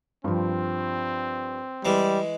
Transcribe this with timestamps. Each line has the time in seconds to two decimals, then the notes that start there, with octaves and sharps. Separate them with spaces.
0.24 G2 F3 C4
1.85 E3 G3 G#3